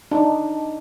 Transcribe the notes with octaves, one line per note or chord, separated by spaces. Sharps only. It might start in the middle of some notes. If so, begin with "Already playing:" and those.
D4 D#4